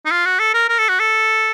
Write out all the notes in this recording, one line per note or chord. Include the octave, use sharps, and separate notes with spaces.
D#4
F4
F#4
A4
A#4
A#4
A4
F#4
A4